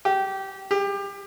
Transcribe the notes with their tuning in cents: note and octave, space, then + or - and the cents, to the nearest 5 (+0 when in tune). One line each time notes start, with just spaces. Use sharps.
G4 -20
G4 +25